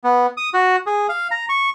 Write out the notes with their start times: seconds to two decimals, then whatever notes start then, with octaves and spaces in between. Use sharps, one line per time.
0.04 B3
0.37 D#6
0.54 F#4
0.86 G#4
1.09 F5
1.31 A#5
1.49 C#6